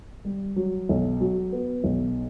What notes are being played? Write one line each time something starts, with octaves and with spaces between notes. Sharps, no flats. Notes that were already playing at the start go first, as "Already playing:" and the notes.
G3
F#3
B1
F#3
B3
B1